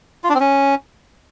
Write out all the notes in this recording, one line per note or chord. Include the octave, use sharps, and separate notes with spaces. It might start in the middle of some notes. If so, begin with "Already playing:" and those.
F4
D4
C4
C#4